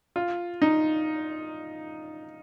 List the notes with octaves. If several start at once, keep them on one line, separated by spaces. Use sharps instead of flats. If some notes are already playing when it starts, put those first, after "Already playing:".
F4
D#4